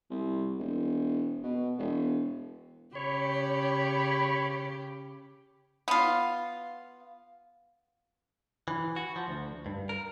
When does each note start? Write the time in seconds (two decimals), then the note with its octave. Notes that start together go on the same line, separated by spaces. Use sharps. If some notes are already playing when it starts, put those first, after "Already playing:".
0.10 C2
0.59 E1
1.43 B2
1.78 E1
2.95 C#3 G4 C#5 B5
5.88 B3 F4
8.68 E3
8.96 F#4
9.16 F3
9.28 D2
9.66 G2
9.89 A#4